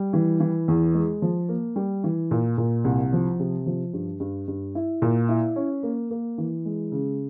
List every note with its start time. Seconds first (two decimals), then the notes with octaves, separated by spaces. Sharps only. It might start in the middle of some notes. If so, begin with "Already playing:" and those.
Already playing: G3
0.13 E3
0.40 E3
0.68 E2
0.94 G#3
1.22 F3
1.49 A#3
1.76 G3
2.04 E3
2.31 A#2
2.58 A#2
2.84 C2
3.13 F3
3.40 C3
3.66 F3
3.93 G2
4.20 G2
4.48 G2
4.75 E4
5.02 A#2
5.29 E4
5.56 C#4
5.83 A#3
6.11 A#3
6.38 E3
6.66 G#3
6.92 C#3